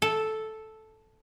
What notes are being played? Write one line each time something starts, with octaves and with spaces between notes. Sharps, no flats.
A4